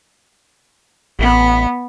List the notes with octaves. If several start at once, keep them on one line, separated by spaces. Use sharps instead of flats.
A1 B3